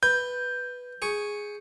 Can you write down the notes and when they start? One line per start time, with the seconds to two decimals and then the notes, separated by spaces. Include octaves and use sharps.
0.03 B4 G6
1.02 G#4 C#6